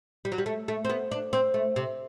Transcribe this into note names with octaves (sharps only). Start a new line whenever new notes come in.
G3
F#3
G3
A3
A3
C4
B3
D4
C4
A3
C3